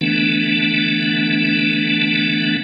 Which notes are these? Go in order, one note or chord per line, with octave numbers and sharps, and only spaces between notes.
D3 E3 A3 B3 D4